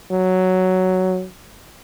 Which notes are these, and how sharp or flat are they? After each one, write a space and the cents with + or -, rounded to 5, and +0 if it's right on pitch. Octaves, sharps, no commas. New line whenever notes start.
F#3 +5